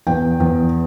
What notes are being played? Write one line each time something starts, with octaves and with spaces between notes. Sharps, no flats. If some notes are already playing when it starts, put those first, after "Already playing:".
E2 G5
E2